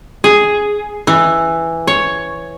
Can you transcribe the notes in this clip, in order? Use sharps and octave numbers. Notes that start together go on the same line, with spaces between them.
G#4
E3
C#5